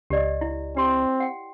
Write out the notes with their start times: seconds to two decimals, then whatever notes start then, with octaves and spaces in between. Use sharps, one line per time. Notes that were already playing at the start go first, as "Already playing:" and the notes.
0.10 C#2 G4 D5 D#5
0.41 E4
0.77 C4 G4 C6
1.20 F#5 G5